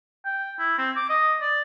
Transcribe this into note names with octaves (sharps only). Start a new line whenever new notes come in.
G5
E4
C4
D6
D#5
D5